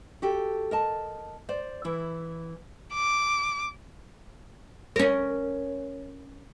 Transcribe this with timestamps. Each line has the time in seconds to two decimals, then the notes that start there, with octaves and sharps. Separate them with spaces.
0.22 F#4 G4 A4
0.71 A#4 D#5 A5
1.49 C5 D5
1.85 E3 E4
2.94 D6
4.96 C#4 A#4